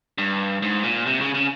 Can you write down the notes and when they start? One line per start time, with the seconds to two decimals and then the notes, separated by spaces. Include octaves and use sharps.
0.18 G2
0.62 G#2
0.83 A#2
1.06 C3
1.21 C#3
1.34 C#3